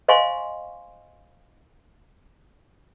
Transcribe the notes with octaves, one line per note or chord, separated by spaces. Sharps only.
C5 D#5 F5 G#5 C6 C#6